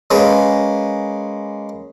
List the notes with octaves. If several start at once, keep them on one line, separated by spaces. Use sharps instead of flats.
G#3 A#3 C#4 B4